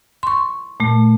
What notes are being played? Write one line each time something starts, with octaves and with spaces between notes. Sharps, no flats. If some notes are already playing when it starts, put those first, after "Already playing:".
C6 C#6
A#2 A3